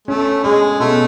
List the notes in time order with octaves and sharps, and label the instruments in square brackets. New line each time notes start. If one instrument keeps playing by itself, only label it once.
[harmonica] A3 [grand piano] C#4
[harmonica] G#3 [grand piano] G#4
[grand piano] B2 [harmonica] A3